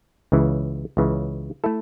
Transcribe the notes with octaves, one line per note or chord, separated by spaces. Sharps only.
C#2 C#3 E3
C#2 C#3 E3
A3 E4 A4